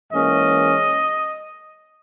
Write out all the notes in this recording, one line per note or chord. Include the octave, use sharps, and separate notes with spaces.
G#2 E3 A#3 C#4 D#5